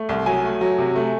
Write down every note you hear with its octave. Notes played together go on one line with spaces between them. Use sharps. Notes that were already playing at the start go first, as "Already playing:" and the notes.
Already playing: A3
C2
F#3 G#5
A3
F#3
C3
A3